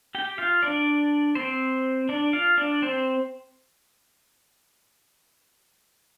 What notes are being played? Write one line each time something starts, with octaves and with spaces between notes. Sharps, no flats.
G4 G5
F4 F5
D4 D5
C4 C5
D4 D5
F4 F5
D4 D5
C4 C5